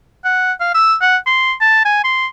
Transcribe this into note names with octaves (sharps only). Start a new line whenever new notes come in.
F#5
F5
E6
F#5
C6
A5
G#5
C6